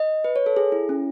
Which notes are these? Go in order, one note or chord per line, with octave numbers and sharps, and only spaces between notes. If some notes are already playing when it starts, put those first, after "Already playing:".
Already playing: D#5
B4
C#5
A4
G#4
E4
C#4